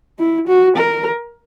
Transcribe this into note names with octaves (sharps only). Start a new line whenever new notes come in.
E4
F#4
A#4